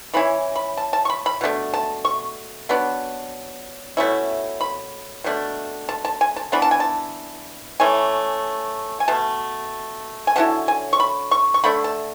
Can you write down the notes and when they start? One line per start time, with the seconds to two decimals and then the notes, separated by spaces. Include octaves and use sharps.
0.14 E3 G#3 C#4 E4 B5
0.56 B5
0.77 A5
0.93 A5
1.05 C#6
1.10 B5
1.26 B5
1.41 B2 A3 D4
1.74 A5
2.05 C#6
2.69 F#3 B3 D4
3.97 B2 A3 C#4 E4
4.61 B5
5.24 B2 A3 D4
5.89 A5
6.05 A5
6.21 G#5
6.36 A5
6.52 E3 B3 D4 B5
6.62 A5
6.71 G#5
6.80 A5
7.80 E3 A3 C#4 G#5
9.00 G#5
9.08 B2 A3 A5
10.27 G#5
10.36 D3 F#3 C#4 E4 A5
10.68 G#5
10.93 C#6
11.00 B5
11.31 C#6
11.54 C#6
11.64 D3 A3 D4 B5
11.84 A5